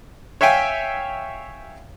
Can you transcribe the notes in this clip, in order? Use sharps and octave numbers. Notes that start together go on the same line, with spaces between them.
C#5 E5 F5 G5 G#5